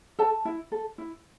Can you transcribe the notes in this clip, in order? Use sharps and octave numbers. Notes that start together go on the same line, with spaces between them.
A4 A5
E4
A4
E4